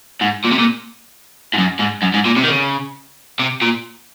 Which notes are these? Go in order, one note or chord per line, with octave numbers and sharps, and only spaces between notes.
G#2
A#2
C3
A#2
G#2
F#2
G#2
F#2
G#2
A#2
C3
D#3
C#3
C3
A#2